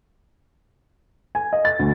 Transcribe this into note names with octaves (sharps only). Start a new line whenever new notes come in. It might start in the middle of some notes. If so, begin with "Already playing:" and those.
G#5
D#5
A6
D2